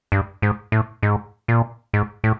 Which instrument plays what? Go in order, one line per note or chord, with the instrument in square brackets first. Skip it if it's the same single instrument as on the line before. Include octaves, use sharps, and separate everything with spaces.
[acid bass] G2
G#2
A2
G#2
A#2
G#2
A2